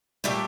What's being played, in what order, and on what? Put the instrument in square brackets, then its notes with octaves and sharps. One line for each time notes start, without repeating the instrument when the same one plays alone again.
[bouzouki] A#2 A3 D4 G4 [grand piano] G3